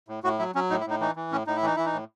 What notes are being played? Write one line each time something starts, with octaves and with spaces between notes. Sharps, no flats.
A2
A2 F#4
F#3 E4
F#3 C#4
A2 D#4
E4
A2 D#4
E3 D#4
E3
A2 C#4
A2 D#4
E4
E3 D#4
E3 E4
D#4
A2